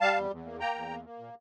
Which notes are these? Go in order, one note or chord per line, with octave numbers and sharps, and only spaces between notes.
G3 F5 A5
E2
E2
A#3
A#3 G5 A#5
E2
A#3
A#3
A#2